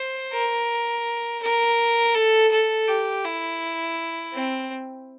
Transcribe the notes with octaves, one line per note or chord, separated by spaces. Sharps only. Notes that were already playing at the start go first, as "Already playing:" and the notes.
Already playing: C5
A#4
A#4
A4
A4
G4
E4
C4